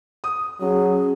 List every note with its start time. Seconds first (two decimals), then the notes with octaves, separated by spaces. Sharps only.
0.24 D#6
0.61 F#3 C#4 G#4